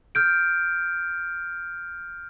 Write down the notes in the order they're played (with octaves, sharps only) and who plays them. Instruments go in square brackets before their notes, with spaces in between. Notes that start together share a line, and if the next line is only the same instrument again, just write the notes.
[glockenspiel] F6 G6 D7